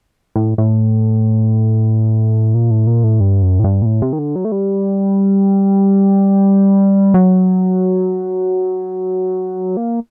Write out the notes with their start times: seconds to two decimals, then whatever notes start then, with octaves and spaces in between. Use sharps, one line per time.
0.36 A2
0.58 A2
2.55 A#2
2.71 A2
2.87 A#2
3.04 A2
3.20 G2
3.42 F#2
3.59 A2
3.64 G2
3.82 A#2
3.86 A2
4.02 C3
4.13 D#3
4.19 D3
4.36 F#3
4.45 A3
4.52 G3
7.14 F#3
9.77 A#3